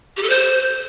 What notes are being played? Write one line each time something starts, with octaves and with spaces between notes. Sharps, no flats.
G4
A4
C5